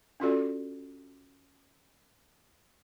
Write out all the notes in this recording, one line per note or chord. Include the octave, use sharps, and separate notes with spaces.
C#4 D4 F4 F#4 A4 D5